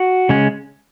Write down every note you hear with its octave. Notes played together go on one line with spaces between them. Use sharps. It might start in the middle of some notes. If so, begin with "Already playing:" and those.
Already playing: F#4
C#3 G#3 C#4